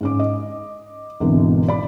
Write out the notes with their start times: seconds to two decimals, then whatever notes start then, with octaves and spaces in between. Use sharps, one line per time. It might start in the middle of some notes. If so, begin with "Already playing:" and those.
0.01 G#2 C#4 D6
0.19 D#5
1.20 G#1 E2 B2 D3 E3
1.68 D5 B5